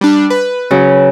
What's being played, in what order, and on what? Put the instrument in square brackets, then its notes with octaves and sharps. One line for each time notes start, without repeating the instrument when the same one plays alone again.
[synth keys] G3 D4
B4
[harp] C#3 F#3